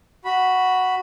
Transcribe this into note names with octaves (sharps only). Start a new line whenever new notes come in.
F#4 B5